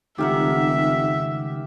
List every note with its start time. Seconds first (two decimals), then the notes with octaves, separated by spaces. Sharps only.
0.18 F1 C#2 D#3 G4 A#4 E5 F#5